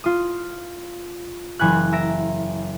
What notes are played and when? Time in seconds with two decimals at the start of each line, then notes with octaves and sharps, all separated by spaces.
0.04 F4 D#6
1.59 F#1 E3 G#5 B5 F#6
1.92 E5 A#5 A#6 D7